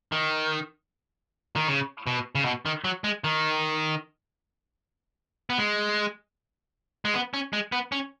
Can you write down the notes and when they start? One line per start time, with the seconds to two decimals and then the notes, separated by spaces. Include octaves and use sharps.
0.12 D#3
1.56 D#3
1.68 C#3
2.07 B2
2.35 C#3
2.45 B2
2.66 D#3
2.84 F#3
3.04 G#3
3.24 D#3
5.50 B3
5.58 G#3
7.05 G#3
7.14 B3
7.34 C#4
7.53 G#3
7.72 B3
7.92 C#4